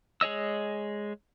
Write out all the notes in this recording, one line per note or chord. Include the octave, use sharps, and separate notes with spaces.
G#3 G#4 C#5 D#5 E6